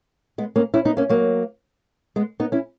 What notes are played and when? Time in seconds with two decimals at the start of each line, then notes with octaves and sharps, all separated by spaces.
0.38 G#3 B3
0.56 A#3 C#4
0.74 C#4 E4
0.85 B3 D#4
0.97 A#3 C#4
1.09 F#3 A#3
2.16 G#3 B3
2.40 B3 D#4
2.52 C#4 E4